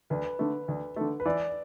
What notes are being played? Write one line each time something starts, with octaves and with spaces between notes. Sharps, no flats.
D2 B4
D3 A3
D2
D3 A3
B4
E3 D5